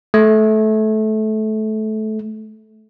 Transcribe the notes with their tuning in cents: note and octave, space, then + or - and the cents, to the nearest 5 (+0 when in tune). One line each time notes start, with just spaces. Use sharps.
A3 -20